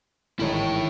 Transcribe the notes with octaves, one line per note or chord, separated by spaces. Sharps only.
A1 D#3 G#3 E4 C#5